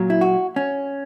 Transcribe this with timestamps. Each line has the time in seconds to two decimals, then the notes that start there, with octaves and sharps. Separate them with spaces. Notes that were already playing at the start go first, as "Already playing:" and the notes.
Already playing: A#2 F#3
0.10 E4
0.21 F#4
0.56 C#4